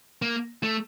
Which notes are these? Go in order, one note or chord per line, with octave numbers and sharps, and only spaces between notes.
A#3
A3